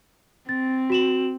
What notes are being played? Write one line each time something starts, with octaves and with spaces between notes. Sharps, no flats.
C4 A6
F#4 E7 F#7